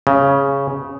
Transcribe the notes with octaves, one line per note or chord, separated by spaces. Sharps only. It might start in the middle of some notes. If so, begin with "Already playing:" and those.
C#3